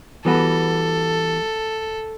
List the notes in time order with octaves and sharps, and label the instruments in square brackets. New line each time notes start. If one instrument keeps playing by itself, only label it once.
[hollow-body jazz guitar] E3 G3 B3 F#4 B4 [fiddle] A4